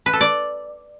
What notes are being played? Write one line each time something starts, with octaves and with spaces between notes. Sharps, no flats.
B4
A4
D5